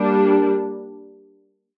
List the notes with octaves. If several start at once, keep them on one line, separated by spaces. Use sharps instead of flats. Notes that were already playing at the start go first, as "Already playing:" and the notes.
Already playing: G3 A#3 D4